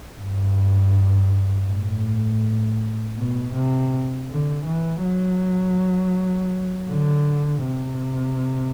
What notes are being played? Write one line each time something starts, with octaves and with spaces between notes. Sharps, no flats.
G2
A2
B2
C3
D3
E3
F#3
D3
C3